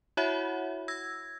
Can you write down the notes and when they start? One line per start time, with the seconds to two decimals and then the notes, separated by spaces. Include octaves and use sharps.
0.17 E4 F#4 C#5 E5 F#5 B5
0.88 E6 G#6 A#6